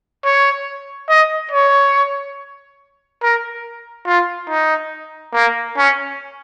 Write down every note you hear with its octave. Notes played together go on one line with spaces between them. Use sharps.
C#5
D#5
C#5
A#4
F4
D#4
A#3
C#4